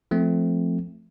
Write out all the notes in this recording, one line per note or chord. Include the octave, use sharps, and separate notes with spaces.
F3 A3 C4